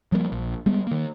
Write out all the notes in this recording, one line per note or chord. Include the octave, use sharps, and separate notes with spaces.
F3 G3 A3 A#3
A#1
G3 G#3 B3
D#3 A#3